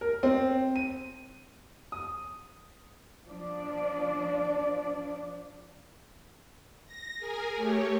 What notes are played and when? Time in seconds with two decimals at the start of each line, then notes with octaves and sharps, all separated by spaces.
0.01 A#4
0.23 C4
0.76 D#7
1.92 D#6
3.28 F3 D4 D5
6.86 A#6
7.18 G#4 A#4 G#5
7.56 A3 G4 C#5